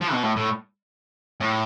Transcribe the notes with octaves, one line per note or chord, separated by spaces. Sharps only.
F3
B2
A2
A2
A2